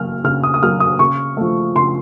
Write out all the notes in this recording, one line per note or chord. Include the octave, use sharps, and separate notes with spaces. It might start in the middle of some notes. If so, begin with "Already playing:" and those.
Already playing: C#3 F#3 A#3 F6
C#3 F6
D#6
D#6
F#3 A#3 F6
D#6
C#3 C#6
F3 A3
C#3 C6